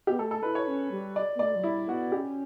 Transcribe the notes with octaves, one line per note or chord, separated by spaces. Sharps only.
B3 G4
A3 A4
A4
E4 B4
C#5
C#4
G3
D5
B3
A3 D5
F#3
G3 E4
B3 F#4
C#4 G4